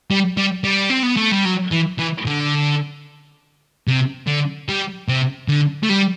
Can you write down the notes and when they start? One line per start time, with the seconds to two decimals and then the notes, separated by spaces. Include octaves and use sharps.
0.11 G3
0.37 G3
0.64 G3
0.90 C4
1.03 B3
1.17 A3
1.32 G3
1.45 F#3
1.72 E3
1.99 E3
2.26 D3
3.87 C3
4.27 D3
4.69 G3
5.08 C3
5.48 D3
5.83 A3
5.89 G3